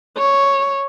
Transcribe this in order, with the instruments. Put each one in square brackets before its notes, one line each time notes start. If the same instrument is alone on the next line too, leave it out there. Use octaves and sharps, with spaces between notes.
[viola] C#5